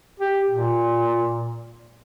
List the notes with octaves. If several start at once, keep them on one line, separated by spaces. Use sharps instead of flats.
G4
A#2